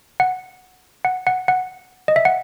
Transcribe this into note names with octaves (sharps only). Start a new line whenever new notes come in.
F#5
F#5
F#5
F#5
D#5
E5
F#5